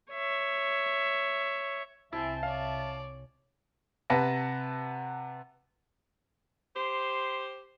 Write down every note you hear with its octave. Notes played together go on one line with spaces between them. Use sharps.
C#5 E5
C2 C4 E4 E5 G#5 A5
C#5 D5 F5
C3 B4 F#5 A5 A#6
G4 C5 C6